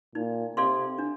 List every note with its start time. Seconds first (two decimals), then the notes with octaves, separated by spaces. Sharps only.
0.15 A#2 D#4
0.57 C3 A4 D5 F5 C6
0.98 D4